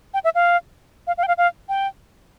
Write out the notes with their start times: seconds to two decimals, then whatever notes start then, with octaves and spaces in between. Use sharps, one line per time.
0.14 G5
0.24 E5
0.35 F5
1.07 F5
1.18 F5
1.23 G5
1.28 F5
1.38 F5
1.69 G5